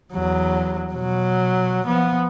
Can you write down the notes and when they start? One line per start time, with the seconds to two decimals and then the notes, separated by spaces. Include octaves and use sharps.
0.13 E2 F#3
0.93 B2 F#3
1.86 F3 B3